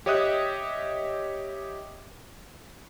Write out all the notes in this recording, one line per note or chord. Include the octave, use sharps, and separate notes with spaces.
G4 C#5 D#5 E5 D#6 F#6